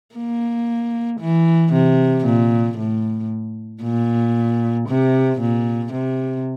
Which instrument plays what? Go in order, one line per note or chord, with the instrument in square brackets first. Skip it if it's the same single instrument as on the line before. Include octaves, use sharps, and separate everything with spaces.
[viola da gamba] A#3
E3
C3
A#2
A2
A#2
C3
A#2
C3